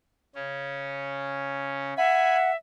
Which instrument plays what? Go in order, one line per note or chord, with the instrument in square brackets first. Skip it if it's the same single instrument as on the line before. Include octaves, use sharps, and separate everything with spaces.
[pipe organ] C#3 C#4
[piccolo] E5 [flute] F#5 [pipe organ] G#5 B5